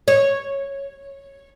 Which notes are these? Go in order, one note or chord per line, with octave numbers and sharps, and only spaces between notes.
C#5